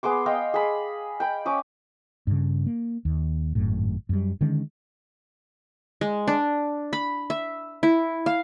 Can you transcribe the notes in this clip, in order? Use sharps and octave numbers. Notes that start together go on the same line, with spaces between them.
B3 G#4 C6 D6
D#5 F5 G5 C6
G#4 B5
G5 B5
C#4 D6 D#6
G2 C#3
A#3
D#2
G#1 F#2 A2
F#2 G3
D3 D#3 G#3 C#4
G#3
D4
B5
E5
E4
F5